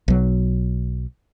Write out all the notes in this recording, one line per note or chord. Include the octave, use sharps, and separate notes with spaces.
B1 F#3